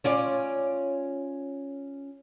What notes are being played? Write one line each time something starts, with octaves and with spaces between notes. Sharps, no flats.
C#4 F4 D5